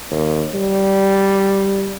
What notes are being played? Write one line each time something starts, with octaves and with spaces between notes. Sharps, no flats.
D#2
G3